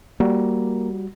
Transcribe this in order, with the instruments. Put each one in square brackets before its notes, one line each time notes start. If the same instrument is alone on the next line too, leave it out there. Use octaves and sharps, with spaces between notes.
[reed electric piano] G3 F#4 [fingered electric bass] A#3